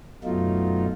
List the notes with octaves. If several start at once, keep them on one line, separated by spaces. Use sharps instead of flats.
F#2 B2 F#3 A3 D#4 F4